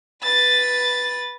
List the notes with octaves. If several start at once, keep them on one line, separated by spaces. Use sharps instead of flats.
B4 A6